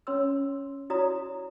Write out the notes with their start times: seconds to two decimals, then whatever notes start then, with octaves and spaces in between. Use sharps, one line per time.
0.07 C#4 C#5 C6 E6
0.90 E4 F#4 C#5 D5 A#5 D#6